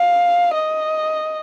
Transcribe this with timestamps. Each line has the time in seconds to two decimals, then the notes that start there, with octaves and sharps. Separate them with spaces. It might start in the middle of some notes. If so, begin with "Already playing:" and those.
Already playing: F5
0.54 D#5